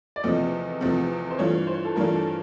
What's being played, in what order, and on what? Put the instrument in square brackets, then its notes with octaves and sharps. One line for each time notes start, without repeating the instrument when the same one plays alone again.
[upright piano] D5
[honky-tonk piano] E2 C3 F3 A3 C4 [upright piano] D#5
[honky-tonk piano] E2 C3 F3 A3 C4
[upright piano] C5
[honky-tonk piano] G2 E3 A3 D4 F4 [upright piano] C#5
[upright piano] C5
A4
[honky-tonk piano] G2 E3 A3 D4 F4 [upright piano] A#4
[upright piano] A4